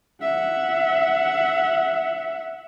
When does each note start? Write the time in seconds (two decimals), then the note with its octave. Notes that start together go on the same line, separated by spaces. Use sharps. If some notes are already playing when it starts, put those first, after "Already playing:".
0.22 E5 F#5